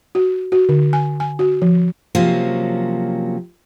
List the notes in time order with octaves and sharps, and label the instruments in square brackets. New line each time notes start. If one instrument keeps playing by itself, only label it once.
[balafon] F#4
F#4
D3
G#5
G#5
F#4
F3
[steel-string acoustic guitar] C3 F3 F#3 A#3 C#4